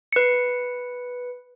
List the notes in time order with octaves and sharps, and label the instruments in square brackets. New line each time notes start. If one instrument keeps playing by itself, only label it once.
[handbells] B4 C#7